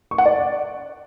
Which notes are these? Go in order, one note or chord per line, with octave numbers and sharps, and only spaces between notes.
C#6
F#5
D5